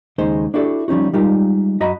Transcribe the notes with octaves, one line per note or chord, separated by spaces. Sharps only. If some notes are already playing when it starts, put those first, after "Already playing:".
D#2 C#3 G#3 D#4 C5
D4 E4 F#4 G4 A4 D5
F3 G3 C#4 D#4 F#4
G3 G#3 D#4 F4 G4 A#4
F#2 F#4 D#5 A#5 B5